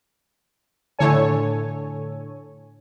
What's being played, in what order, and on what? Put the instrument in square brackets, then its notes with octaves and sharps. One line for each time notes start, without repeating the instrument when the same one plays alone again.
[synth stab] A2 D3 A4 C#5 G#5